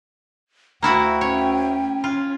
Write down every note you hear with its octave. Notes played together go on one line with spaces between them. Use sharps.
D2 A#3 E4 F#4 G5
C#4 C#5
C#4 F4